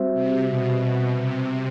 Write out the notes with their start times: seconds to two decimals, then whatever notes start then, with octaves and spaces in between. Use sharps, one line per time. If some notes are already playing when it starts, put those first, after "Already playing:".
Already playing: G3 C4 F#4 C5 E5
0.14 C3
0.48 B2
0.81 B2
1.16 C3